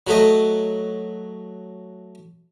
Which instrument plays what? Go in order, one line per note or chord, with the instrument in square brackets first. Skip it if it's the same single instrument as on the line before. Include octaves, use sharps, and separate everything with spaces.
[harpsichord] F#3 A3 D#5